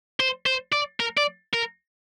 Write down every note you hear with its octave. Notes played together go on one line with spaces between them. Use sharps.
C5
C5
D5
A#4
D5
A#4